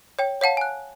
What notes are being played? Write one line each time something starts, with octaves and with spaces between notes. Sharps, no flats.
C#5 G5
C#5 F5 F#5 A5
G#5 F#6